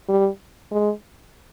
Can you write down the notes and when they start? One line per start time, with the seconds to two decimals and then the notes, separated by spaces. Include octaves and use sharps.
0.08 G3
0.71 G#3